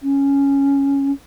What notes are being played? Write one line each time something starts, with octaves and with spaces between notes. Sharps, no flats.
C#4